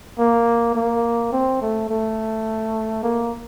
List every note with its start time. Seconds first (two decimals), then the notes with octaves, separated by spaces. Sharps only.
0.19 A#3
0.76 A#3
1.33 C4
1.62 A3
1.90 A3
3.03 A#3